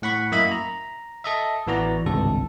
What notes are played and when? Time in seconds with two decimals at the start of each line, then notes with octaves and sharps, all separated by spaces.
0.02 A2 F#5 B5 C#6
0.32 F#2 A#3 E4 D#5 E5 B5
0.52 A#5
1.24 A4 D#5 E5
1.67 A1 E3 B3 F#4 D5 A#5
2.06 G#1 C#2 G2 C3 A4